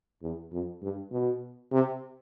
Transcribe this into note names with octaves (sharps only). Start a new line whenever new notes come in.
E2
F2
G2
B2
C3